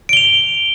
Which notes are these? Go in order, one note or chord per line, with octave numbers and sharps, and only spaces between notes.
D7 F7 G7